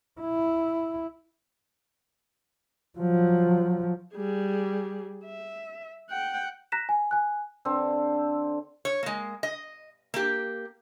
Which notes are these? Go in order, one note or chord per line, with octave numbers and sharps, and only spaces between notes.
E4
F3 F#3
G3 G#4
E5
F#5 G5
A#5 F#6 A#6 B6 E7
G#5
G#5 F#6
D3 C4 A4
C#5
G#3 A#3
D#5
A#3 G4